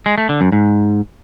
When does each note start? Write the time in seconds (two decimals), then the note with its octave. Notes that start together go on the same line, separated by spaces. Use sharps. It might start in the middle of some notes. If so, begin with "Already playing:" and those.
0.06 G#3
0.18 A3
0.29 D3
0.41 F#2
0.52 G#2